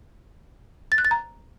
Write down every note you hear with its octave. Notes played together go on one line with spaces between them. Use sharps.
A6
F#6
A6
A#5